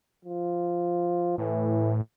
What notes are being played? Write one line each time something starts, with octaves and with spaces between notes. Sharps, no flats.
F3
A2 E3